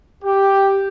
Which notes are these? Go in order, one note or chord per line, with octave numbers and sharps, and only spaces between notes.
G4